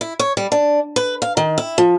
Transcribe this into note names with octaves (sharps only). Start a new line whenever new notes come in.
E4
C#5
G3
D4
B4
F5
D#3
E4
F3